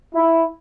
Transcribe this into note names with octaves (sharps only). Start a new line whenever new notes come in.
E4